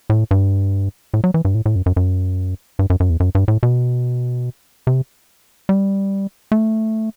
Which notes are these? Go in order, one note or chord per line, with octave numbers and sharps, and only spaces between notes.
A2
G2
A2
F#3
E3
G2
A2
A2
F#2
F#2
F#2
G2
F#2
F#2
E2
F#2
G2
A2
B2
C3
G3
A3